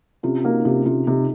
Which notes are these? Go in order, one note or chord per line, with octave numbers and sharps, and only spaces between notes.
C3 C#4 F4
A#3 D#4 F#4
C3 C#4 F4
C3 C#4 F4
C3 C4 D#4